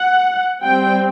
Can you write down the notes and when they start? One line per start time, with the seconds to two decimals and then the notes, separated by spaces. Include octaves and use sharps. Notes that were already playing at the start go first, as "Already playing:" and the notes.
Already playing: F#5
0.62 G3 C4 G5